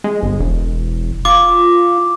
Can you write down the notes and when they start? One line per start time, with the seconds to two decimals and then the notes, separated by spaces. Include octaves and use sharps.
0.04 G#3
0.23 G1
0.40 E1
1.25 F4 D6